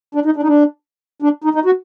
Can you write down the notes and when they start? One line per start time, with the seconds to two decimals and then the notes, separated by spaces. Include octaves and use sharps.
0.15 D4
0.25 D#4
0.36 D4
0.43 D#4
0.47 D4
1.22 D4
1.44 D#4
1.55 D#4
1.66 F#4